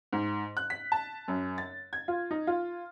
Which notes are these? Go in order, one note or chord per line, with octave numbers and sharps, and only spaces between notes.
G#2
F#6
B6
A5
F#2
A6
G#6
F4
D#4
F4